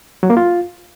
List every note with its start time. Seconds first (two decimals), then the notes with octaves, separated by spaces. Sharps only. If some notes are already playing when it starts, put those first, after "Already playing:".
0.23 F#3
0.30 A#3
0.37 F4